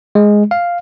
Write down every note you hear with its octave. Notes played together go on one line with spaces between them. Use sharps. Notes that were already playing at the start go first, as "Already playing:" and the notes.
G#3
F5